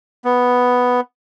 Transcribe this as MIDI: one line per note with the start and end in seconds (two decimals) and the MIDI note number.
0.25 1.00 59